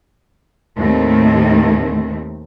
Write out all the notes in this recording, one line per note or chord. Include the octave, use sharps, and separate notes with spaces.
D#2 A2 D#3 A3 C4